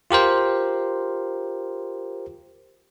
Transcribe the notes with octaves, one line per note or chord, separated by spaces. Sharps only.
F4 G4 A#4 C5